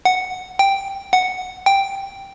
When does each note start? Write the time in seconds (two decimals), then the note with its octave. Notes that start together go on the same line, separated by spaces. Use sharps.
0.05 F#5
0.59 G5
1.13 F#5
1.66 G5